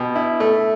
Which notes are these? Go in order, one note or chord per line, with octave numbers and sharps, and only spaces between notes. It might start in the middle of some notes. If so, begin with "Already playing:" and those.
Already playing: B2 G4
E4
A3